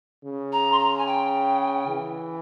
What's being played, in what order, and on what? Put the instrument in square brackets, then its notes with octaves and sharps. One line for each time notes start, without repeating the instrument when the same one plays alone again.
[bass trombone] C#3
[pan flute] A#5
C6
A#5
G#5
G5
[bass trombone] E3